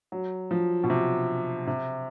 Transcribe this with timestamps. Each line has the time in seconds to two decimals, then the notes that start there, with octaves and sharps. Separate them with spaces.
0.12 F#3
0.51 F3
0.84 B2
0.90 C3
1.67 C3